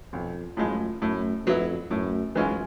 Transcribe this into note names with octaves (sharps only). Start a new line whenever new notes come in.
B1 F2
F#2 A2 F3 G#3
F#2 A2
F2 F#3 B3 E4
F#2 A2
F#2 E3 G#3 C#4 F4